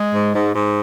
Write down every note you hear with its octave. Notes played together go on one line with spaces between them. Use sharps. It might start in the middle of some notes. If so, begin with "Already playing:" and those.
Already playing: G#3
G#2
G#2
G#2